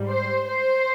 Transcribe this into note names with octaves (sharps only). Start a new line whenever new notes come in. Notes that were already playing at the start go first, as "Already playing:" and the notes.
Already playing: G#2 G3
C5
C5